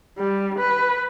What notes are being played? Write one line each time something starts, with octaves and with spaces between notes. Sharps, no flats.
G3
B4